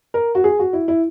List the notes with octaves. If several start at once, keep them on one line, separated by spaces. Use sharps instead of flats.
A#4
F#4
G#4
F#4
E4
E4